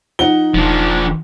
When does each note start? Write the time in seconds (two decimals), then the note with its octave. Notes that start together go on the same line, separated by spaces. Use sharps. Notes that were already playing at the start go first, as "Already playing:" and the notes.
0.19 F3 D#4 F#5 G7
0.54 E1 F3 D4